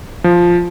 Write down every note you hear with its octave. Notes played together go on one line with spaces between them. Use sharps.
F3